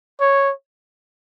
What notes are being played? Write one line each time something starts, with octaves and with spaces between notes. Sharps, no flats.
C#5